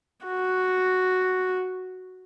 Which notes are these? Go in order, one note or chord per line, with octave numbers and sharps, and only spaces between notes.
F#4